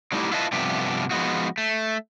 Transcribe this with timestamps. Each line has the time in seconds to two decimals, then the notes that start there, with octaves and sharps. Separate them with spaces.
0.12 F#3 G3 A3 D#4 E4 G4
0.32 E4 F4 B4 D#5 G#5 A5
0.52 G2 C3 F3 A3 B3 G4
1.11 F3 G#3 B3 D#4 F#4
1.58 A3